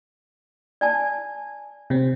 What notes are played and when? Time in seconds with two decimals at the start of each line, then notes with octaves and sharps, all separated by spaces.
0.81 D5 G#5 A5
1.90 C3 C4 C#5